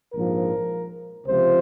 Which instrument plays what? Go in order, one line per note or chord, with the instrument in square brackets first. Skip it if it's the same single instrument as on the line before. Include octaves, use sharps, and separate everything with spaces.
[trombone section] A#1 G#2 F3 A#4
C#2 C3 F3 C5